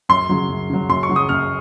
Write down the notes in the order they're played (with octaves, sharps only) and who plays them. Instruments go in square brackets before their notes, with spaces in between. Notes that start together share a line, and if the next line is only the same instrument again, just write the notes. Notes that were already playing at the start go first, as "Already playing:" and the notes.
[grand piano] F#2 [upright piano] C6
[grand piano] C#3 F#3
F#2
C#3 F#3
[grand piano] F#2 [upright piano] C6
[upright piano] C#6
[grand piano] C#3 F#3
[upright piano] D#6
[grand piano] F#2 [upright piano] F6